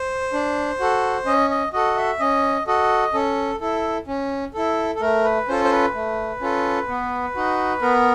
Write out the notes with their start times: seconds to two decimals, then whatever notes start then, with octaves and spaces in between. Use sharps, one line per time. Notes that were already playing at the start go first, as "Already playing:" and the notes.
Already playing: C5
0.33 D4
0.80 F#4 A4
1.26 C#4 D#5
1.50 D#5
1.73 F#4 A4 D#5
1.96 E5
2.20 C#4 D#5
2.67 F#4 A4 D#5
3.14 C#4 A4
3.60 E4 A4
4.07 C#4
4.54 E4 A4
4.95 A4
5.01 A3 A#4
5.24 B4
5.48 C#4 F4 A4 C5
5.64 C5
5.72 B4
5.94 A3
6.41 C#4 F4 A4
6.88 B3
7.35 D#4 F#4
7.82 B3 A#4